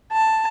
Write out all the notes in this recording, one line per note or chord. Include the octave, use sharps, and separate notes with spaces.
A5